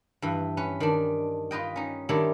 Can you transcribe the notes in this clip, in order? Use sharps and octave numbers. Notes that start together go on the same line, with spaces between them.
G2 E3
C#4 B4
D#3 D4
F4 B4 D#5 G5
C#4 D#4
D#3 G3 D4 E4 G4 C#5